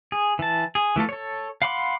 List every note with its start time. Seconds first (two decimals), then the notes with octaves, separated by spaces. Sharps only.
0.12 G#4
0.39 E3 A5
0.75 G#4
0.96 E3 A3 F4 A4
1.09 A4 C#5
1.62 F5 F#5 B5 C6 D6